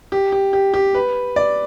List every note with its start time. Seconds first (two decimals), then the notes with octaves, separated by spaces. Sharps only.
0.12 G4
0.32 G4
0.53 G4
0.74 G4
0.94 B4
1.36 D5